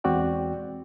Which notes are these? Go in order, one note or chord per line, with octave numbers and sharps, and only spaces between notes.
E2 G#3 C4 F#4 D5 G5